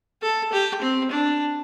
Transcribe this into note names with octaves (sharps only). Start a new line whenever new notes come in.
A4
G4
C4
D4